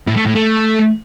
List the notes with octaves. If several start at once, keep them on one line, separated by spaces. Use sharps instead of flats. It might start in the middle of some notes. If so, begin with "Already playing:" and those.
A2
A3
A2
A3